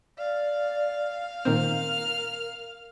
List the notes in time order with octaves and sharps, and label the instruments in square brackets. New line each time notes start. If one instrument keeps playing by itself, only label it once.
[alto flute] D5 [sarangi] F5
[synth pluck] A#2 D#3 C4 [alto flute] A#4 [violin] F6